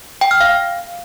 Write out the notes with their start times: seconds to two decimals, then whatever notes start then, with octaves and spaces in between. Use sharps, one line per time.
0.21 G5
0.31 F6
0.41 F5